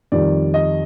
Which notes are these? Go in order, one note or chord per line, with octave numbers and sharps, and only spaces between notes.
F2 D#3 G3 D5
D#5